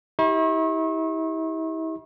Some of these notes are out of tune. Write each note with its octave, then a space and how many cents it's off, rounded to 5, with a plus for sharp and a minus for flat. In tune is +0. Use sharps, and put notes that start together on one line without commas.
E4 -40 G4 +0 C#6 -40